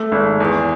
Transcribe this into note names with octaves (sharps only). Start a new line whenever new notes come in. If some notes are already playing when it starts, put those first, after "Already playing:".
Already playing: A3
G#1
E2